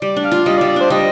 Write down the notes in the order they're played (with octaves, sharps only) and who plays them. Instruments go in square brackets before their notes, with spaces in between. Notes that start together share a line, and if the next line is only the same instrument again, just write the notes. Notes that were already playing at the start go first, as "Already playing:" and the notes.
[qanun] G3 [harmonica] D5
[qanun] D4
[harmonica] F5
[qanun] F4
[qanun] G3 [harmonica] D#5
[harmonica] D5
[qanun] G3
[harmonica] D5
[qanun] D4 [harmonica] C5
[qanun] G3 [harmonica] D#5